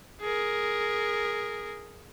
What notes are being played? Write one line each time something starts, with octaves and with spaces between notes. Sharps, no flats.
G#4 A#4